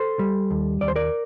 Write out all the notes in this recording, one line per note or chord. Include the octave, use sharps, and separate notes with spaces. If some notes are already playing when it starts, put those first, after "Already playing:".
Already playing: A4 C5
G3
D#2
D#2 D5
C5
A#4 D5